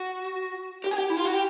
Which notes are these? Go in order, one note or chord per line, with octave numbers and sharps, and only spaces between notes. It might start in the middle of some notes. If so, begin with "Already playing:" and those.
Already playing: F#4
G4
G#4
G4
E4
F4
F#4
G4